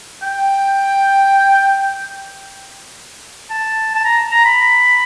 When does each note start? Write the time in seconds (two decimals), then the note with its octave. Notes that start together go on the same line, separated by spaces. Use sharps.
0.23 G5
3.50 A5
3.95 A5
4.04 A#5
4.32 A#5
4.45 B5